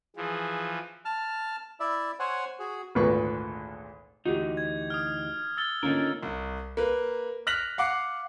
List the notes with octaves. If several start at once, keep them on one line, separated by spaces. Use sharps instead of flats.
E3 F3 G#4
A5 F6
E4 D5 E5
C5 C#5 F#5 G#5
F#4 G#4
G#1 D2 A#2 B4 C#6
D2 E3 D#4 F#4 G4
G#6
D#6 F6
E6 A6 G7
D3 A#3 C#4 D#4 F4 A#4
C2
A#3 B4
F6 F#6 A#6 B6 F7 F#7
F5 F#5 D6 F#6 C7